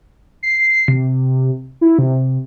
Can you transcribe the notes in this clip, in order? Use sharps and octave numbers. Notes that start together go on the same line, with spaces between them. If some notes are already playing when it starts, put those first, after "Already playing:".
C7
C3
E4
C3